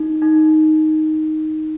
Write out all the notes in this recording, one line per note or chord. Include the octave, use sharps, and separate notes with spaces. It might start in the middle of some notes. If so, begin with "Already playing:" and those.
Already playing: D#4
D#4